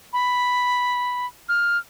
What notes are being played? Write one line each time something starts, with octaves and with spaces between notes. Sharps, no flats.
B5
F6